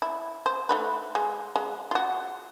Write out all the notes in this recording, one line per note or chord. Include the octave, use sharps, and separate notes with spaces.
E4
C5
A3 D#4 B4
G#3
G#3
F4 F#4